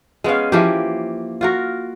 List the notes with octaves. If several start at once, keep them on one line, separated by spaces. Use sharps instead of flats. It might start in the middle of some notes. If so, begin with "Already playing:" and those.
G#3 B3 C#4 F5
E3 F3 A#3 G4
F4 F#4 A#4